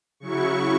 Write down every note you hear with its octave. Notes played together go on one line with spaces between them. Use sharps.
C#3 F#3 E4 C#6